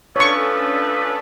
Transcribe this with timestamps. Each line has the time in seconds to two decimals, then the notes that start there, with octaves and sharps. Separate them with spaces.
0.16 F3 A3 C#4 D4 A4 B4 C#5 C#6